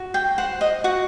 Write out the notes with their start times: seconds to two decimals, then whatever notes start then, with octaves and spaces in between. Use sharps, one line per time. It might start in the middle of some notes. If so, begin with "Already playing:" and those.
Already playing: F#4
0.14 G5
0.38 C5 F#5
0.61 D#5
0.84 F#4 F#5